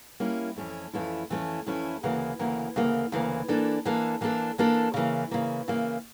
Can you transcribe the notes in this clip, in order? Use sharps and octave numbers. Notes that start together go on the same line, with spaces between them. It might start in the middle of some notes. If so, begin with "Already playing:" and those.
G3 A#3 C#4 E4
F2 E3 A3 C#4 E4
F2 E3 A3 C#4 E4
F2 E3 A3 C#4 E4
F2 E3 A3 C#4 E4
D2 C#3 E3 A#3
D2 C#3 E3 A#3
D2 C#3 E3 A#3
D2 C#3 E3 A#3
E3 A#3 D4 A4
E3 A#3 D4 A4
E3 A#3 D4 A4
E3 A#3 D4 A4
C#3 E3 A#3
C#3 E3 A#3
C#3 E3 A#3